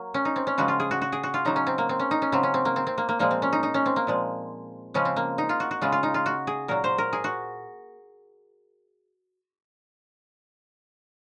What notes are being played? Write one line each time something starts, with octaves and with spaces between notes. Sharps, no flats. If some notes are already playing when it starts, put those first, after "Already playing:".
Already playing: F#3 A#3
C#4
D#4
C4
C#4
C#3 F3 G#3 F#4
F4
G#4
F#4
F#4
G#4
F#4
F4
C#3 F#3 D#4
C#4
C4
A#3
C4
C#4
D#4
C#4
C#3 F#3 C4
C#4
C4
A#3
C4
C4
A#3
A#3
A#2 F3 G#3 A#3
C4
C#4
D#4
D#4
C#4
C4
A#3
A#2 F3 G#3
C#3 F3 G#3 C#4
C4
A#3
D#4
F4
F#4
F#4
C#3 G#3 F4
F4
D#4
F4
F#4
G#4
A#2 F#3 A#4
C5
A#4
G#4
F#4